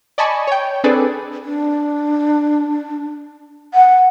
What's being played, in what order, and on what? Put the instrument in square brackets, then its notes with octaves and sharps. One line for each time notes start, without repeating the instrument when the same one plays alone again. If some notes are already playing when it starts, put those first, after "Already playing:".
[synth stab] D5 D#5 G#5 A5 B5 C#6
C#5 G5
C4 D4 G#4 A4 B4 D5
[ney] D4
F#5